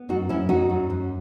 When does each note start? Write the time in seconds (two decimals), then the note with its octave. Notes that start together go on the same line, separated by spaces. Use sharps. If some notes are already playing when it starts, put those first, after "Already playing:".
Already playing: B3
0.09 F#2 D#4 F#4
0.29 F#2 C#4 E4
0.49 F#2 D#4 F#4
0.70 F#2
0.90 F#2